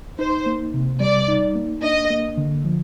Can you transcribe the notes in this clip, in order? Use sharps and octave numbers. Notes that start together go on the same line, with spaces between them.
D#4 C5
A#3
C3
G3 D5
D#4
A#3
D4 D#5
A#3
D3
F3